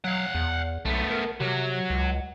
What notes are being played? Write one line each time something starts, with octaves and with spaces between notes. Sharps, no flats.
F#3 F5 F#5
E2
B1 A3 B3
A#4
C3 F#3 F#4
C#2